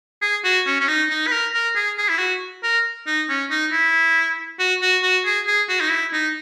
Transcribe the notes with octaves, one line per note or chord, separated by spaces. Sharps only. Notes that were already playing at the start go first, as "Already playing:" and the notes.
G#4
F#4
C#4
C#4
D#4
D#4
B4
A#4
A#4
G#4
G#4
E4
F#4
A#4
D#4
C#4
D#4
E4
F#4
F#4
F#4
G#4
G#4
F#4
D#4
E4
D#4